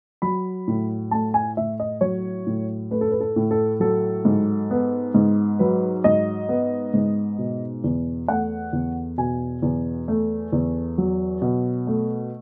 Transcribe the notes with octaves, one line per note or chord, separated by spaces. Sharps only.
F#3 B5
A2
A3 A5
G#5
A2 E5
D#5
F#3 C#5
A2
A3 B4
A4
B4
A4
A2
A4
F#3 A4
G#2
B3
G#2
F#3 B4
G#2 D#5
B3
G#2
B2
E2
A3 F#5
E2
B2 G#5
E2
A3
E2
F#3
B2
A3